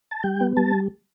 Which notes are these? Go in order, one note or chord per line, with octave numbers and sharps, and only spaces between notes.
A5
G3 G5
B3
G3 A5